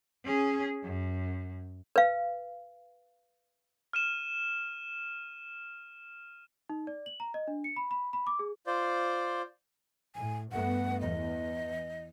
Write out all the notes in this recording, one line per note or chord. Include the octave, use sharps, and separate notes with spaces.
C#4 G#4
F#2
B4 F5
F6 D#7 E7
D#4
D5
F#7
A#5
D#5
D4
C#7
B5
B5
B5
D6
G#4
F4 C5 D5
A2 G#5
G2 A3 B3 F#5
E2 D#5